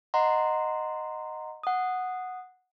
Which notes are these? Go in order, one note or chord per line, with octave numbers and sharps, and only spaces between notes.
D#5 F#5 A#5 C6
F#5 D#6